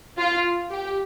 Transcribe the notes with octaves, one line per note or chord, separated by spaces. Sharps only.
F4
G4